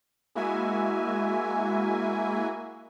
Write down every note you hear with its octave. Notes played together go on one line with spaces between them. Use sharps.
G#3 A#3 E4 F#4 E5 G#5